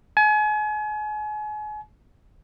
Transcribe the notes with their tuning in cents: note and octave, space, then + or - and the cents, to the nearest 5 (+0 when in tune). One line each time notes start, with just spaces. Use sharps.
G#5 +35